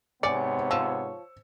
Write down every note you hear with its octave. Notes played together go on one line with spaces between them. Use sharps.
G#2 C3 B3 C#5 D5 G#5 C#7
F3 E6